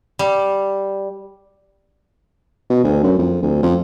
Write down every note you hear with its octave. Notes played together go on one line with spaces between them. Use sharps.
G3
B2
D2
F#2
F2
D2
F2